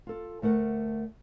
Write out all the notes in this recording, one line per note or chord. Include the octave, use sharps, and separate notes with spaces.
F4 A4
D2 A3 A#4 F#5